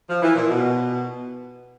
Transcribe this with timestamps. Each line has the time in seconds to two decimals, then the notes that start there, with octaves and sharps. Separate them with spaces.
0.09 F3
0.22 E3
0.36 A#2
0.49 B2